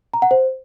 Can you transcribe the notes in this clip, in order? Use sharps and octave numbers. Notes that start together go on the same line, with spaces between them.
A#5
F#5
C5